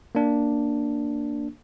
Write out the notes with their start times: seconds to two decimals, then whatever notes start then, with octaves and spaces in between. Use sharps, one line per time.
0.15 A#3 D4